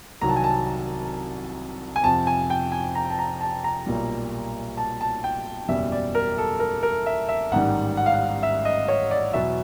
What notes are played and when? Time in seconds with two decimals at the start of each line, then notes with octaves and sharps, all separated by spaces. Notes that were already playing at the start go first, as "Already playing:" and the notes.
0.21 C2 C3 D#3 F#3 A#5
0.29 A5
0.36 G#5
0.44 A5
1.96 G#5
2.03 F2 C3 F3 A5
2.27 G#5
2.50 G5
2.72 G#5
2.95 A#5
3.10 A5
3.19 A#5
3.41 A5
3.64 A#5
3.87 B1 A#2 G3
4.77 A5
5.01 A5
5.24 G5
5.68 F#1 E2 B2 G3 E5
5.92 D5
6.15 A#4
6.38 A4
6.60 A#4
6.83 A#4
7.06 E5
7.29 E5
7.51 A1 G#2 D#3 G3 F#5
7.97 F#5
8.06 F5
8.14 F#5
8.43 E5
8.65 D#5
8.88 C#5
9.11 D5
9.33 E2 B2 F#3 E5